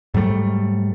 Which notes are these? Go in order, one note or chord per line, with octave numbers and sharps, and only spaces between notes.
G#2 F#3 G3 A3